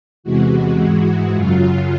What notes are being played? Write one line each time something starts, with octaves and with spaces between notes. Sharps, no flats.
E2 C3 E3 G#3 F#4
G#2 E3 G#3
F#2 C#3 F#3 F4